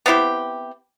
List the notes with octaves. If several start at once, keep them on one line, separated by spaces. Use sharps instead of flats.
B3 C4 E4 G4